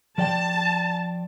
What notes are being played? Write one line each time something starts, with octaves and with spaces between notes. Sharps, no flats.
F3 D5 G5 A5